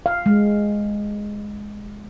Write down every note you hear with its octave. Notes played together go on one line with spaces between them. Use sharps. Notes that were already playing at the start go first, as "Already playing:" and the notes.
F5
G#3